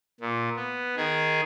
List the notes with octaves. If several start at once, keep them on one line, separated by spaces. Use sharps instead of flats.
A#2
B3
D#3 G#4